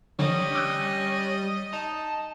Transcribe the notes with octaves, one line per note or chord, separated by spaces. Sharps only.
D3 F3 G3 C#4 D#5
D6 E6 F#6
D#4 A5